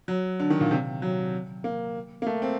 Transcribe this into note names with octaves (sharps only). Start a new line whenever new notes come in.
F#3
D3
D#3
A#2
C3
F#3
A#3
A#3
A3
C4